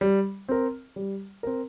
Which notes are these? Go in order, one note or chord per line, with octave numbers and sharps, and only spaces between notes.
G3
C4 A#4
G3
C4 A#4